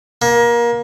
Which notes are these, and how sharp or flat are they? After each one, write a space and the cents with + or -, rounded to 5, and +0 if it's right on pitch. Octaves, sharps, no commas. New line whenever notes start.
A#3 +25